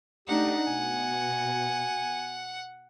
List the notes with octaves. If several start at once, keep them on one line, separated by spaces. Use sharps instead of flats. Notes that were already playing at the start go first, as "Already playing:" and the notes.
A3 D4 D#4 G4 F#5
B2 G#5